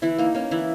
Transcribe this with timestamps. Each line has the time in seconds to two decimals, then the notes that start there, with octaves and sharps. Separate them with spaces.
0.02 E3 E4
0.18 A#3 D#4
0.35 A#3 C#4
0.51 E3 E4